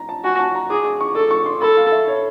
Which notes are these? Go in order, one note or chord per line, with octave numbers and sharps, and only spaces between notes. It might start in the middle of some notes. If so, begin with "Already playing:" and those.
Already playing: A#5
A5
F#4 G#5
A5
A#5
G#4 D6
D6
C#6
A4 D6
C#6
C6
A4 B5
F5
E5
C#5